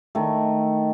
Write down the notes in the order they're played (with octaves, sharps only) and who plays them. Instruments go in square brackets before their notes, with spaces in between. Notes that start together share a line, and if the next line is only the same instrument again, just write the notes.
[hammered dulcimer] D#3 A3